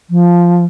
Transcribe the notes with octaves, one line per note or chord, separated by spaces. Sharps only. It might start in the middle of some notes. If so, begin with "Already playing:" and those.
F3